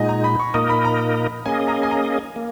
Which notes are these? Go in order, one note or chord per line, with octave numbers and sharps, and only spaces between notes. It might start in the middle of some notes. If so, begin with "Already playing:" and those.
Already playing: A#2 G#3 D#4 D#5 F#5 G#5
A#5
B5
C#6
A#2 A#3 D#4 A#4 D#5 D#6
B5
A#5
A#3 C#4 G#4 D#5 G#5
A#5
G#5
A#5
A#3